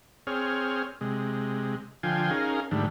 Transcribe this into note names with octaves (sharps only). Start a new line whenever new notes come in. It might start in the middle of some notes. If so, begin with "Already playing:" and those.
C4 G#4 C#5 F6
C3 G#3
D3 F3 F4 G5 G#5 C6
C#4 D#4 G#4 A#4 F5
G#2 D3 D#3 G3 A3